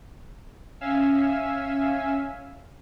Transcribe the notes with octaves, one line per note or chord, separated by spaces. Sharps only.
C#4 E5 F5 G#5 E6